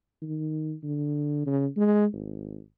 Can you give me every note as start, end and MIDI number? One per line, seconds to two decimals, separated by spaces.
0.22 0.74 51
0.83 1.43 50
1.46 1.67 49
1.77 2.06 56
2.13 2.59 32